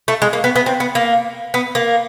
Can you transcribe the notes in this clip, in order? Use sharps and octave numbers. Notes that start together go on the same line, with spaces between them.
A3
G#3
A#3
B3
B3
C4
B3
A#3
B3
A#3